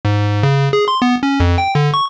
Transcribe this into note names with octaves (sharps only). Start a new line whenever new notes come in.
G#2
C#3
G#4
C6
B3
C#4
F2
G5
D3
C#6